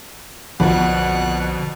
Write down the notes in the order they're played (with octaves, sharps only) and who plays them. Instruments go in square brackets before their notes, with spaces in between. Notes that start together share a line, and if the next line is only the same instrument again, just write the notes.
[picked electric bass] B1 D3 D4 [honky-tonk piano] F2 B2 [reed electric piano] F3 [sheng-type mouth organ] F#5 F#6